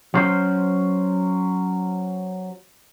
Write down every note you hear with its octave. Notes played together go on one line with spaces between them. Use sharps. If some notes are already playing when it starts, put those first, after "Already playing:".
F#3 C#4 C5